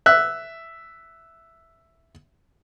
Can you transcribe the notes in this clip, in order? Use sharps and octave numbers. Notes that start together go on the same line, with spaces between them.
E5 F#6